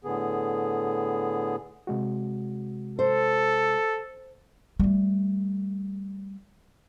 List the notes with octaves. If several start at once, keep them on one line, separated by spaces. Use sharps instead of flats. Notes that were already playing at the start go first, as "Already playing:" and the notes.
A2 D3 B3 G#4
C3 G#3 F#4
A4 C5
G3 A3